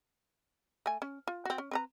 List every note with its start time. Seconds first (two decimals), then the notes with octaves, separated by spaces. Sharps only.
0.86 A3 G#5
1.02 C#4
1.27 F4
1.45 C4 F#4
1.58 C#4
1.71 C4 B4 A#5